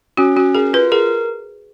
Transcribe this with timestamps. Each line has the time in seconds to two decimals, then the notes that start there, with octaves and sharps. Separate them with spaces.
0.17 C#4 F#4
0.37 C#4 F#4
0.55 G#4 A#4
0.73 F4 B4
0.92 G#4 A#4